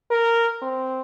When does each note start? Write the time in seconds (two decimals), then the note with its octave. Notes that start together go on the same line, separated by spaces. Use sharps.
0.11 A#4
0.62 C4